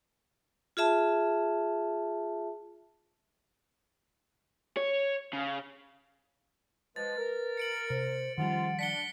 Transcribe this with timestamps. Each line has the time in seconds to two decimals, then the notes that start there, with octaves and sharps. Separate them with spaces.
0.77 F4 G#4 E5 A5
4.77 C#5
5.33 C#3
6.96 F3 G#3 B4 A6
7.18 A#4
7.57 C#7 D7 F#7
7.90 C3 C5
8.38 G#2 D#3 F3 G3 C#4 F4 F#5
8.79 D4 B6 C#7 G7